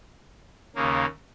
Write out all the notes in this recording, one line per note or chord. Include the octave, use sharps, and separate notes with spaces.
D#2 C#3 A#3